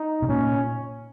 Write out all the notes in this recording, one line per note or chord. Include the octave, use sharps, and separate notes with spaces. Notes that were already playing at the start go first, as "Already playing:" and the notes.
Already playing: D#4
C3
A#2 C#4